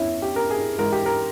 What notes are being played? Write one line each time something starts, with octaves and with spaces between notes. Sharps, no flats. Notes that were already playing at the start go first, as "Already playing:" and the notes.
Already playing: E2 E3 C#4 E4
G4
A#4
G#4
G#2 E3 A#4
G4
A#4